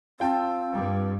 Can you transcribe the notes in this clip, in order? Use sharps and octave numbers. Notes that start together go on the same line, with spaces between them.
C4 F4 G5 A5
G2 G3